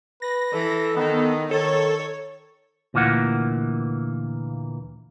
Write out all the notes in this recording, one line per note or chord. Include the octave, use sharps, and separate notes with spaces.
B4 A#6
E3 A4
D#3 B3
D#3 A4 C#5
D2 A#2 E3 A#3 F#5